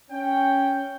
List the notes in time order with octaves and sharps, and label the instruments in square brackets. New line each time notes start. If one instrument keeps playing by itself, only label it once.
[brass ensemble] C#4 G5